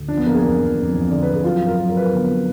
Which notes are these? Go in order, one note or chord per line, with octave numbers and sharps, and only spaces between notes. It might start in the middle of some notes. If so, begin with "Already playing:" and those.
Already playing: D2
F3 D4
B3
F2 A#3
G#4
F2 A#4
F2
F2
F2
D3 D5
B4
F2
G#4
F#3 F4
F4
F#2
A#4
F#2 A#4
A#4
F#3 B4
A#4
D3 B3
F#3